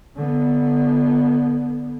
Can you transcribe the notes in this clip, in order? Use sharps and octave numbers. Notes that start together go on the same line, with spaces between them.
D3 B3